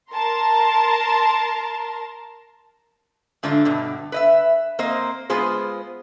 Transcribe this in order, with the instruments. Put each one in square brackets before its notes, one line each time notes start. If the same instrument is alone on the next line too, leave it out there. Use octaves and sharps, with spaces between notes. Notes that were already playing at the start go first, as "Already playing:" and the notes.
[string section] A#4 A5 A#5 C6
[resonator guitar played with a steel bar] G#2 D3 A3 D4 F4
G2 B2 D3
B4 D#5 E5
A#3 C4 C5 D#5
G#3 B3 F4 G#4 C5